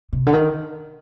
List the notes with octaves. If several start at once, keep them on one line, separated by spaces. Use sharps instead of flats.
C3
D3
D#3